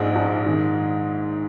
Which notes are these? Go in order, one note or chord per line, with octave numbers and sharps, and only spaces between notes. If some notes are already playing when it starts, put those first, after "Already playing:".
Already playing: A#1 G#2 G#3
G#2
D#3